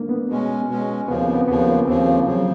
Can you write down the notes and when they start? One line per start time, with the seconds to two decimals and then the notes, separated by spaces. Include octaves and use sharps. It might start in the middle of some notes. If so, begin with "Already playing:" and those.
Already playing: A3 A#3 D4
0.09 B3
0.29 B2 G#3 C#4
0.70 B2 G#3 C#4
1.08 D#2 C#3 F3 B3
1.22 C4
1.35 B3
1.48 D#2 C#3 F3 B3
1.68 A#3
1.88 D#2 C#3 F3 C4
2.07 A#3
2.27 C#3 F3 F#3